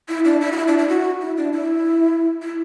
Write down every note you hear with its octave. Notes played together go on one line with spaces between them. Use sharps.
E4
D4
E4
F#4
E4
D4
E4
F#4
E4
D4
E4
E4